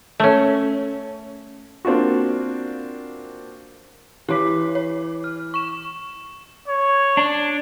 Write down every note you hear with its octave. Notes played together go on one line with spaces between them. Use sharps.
A3 C#4
A#3 C4 D4 F4 F#4
E3 G4 C#5 D6 B6
C#5
F6
C#6 E7
C#5
D4